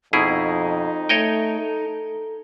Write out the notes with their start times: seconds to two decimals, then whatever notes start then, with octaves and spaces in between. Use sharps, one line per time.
0.13 F2 B2 D#4 E4 G#4
1.09 A3 C#5 D#5 G5
1.59 A4